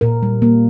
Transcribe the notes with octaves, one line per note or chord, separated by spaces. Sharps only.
A#2 A#4
G3
A#3